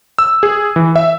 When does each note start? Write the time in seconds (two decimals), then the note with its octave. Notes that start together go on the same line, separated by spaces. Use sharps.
0.19 E6
0.43 G#4
0.76 E3
0.96 E5